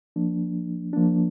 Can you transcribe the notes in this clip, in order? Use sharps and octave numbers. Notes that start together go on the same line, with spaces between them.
F3 A#3 D4
F3 A#3 D4